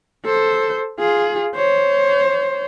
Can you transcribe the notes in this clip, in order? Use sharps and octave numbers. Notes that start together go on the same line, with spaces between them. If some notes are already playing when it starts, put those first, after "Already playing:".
A4 C5
F4 G#4
C5 C#5